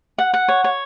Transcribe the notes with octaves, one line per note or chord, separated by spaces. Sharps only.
F#5
F#5
C#5
C#5